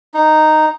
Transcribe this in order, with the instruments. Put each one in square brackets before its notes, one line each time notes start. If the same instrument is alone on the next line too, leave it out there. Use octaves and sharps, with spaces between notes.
[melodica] D#4